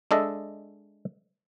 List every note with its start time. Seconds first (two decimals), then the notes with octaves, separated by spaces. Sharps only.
0.11 G#3 D4 A4 D#5 E5